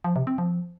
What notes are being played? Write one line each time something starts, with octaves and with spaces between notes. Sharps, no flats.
F3
C3
C4
F3